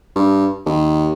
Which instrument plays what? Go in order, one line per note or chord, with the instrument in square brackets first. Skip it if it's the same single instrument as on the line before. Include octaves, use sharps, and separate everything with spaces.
[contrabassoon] G2
D#2